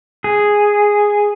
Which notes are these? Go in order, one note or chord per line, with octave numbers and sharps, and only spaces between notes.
G#4